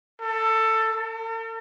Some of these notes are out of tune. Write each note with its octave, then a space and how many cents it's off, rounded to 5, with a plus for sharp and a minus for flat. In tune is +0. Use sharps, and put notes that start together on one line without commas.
A4 +15
A4 +45